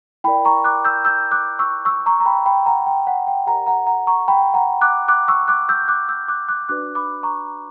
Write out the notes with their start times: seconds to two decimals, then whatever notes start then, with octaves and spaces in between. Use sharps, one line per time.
0.24 E4 A#4 D5 G5 B5
0.45 A#5 C#6
0.64 D6 F#6
0.85 E6 G6
1.05 E6 G6
1.32 D6 F#6
1.59 C#6 E6
1.85 C#6 E6
2.06 A#5 C#6
2.20 A#5
2.26 G5 B5
2.46 G5 B5
2.66 F#5 A#5
2.86 G5
3.07 F#5
3.27 G5
3.47 G4 A#4 D5 F#5 A#5
3.66 F#5 A#5
3.87 F#5 A#5
4.07 A#5 C#6
4.28 G5 B5
4.54 F#5 A#5
4.81 D6 F#6
5.08 D6 F#6
5.28 C#6 E6
5.48 D6 F#6
5.69 E6 G6
5.88 D6 F#6
6.09 E6 G6
6.28 D6 F#6
6.48 D6 F#6
6.69 D4 F#4 B4 D5 D6 F#6
6.95 B5 D6
7.23 A#5 C#6